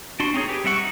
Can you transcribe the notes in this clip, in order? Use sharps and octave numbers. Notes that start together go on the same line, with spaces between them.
D4 F#4 C6
C4 C#4 D#4 G#4 C#5
G4 G#4 B4
G3 C4 E5 F#5 C#6
D#4